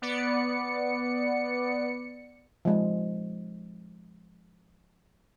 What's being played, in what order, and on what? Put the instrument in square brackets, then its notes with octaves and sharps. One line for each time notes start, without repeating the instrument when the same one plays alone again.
[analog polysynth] B3 D5 C#7
[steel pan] F3 G#3